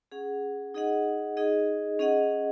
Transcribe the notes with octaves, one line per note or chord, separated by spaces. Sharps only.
C#4 G#4 F#5
D#4 G#4 D#5 F#5
D#4 G#4 D#5
C#4 G#4 D#5 F#5